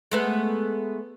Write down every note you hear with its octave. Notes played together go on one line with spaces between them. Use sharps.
G#3 A3 B3